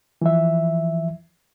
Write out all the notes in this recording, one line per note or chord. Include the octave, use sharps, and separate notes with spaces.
E3 F3 E5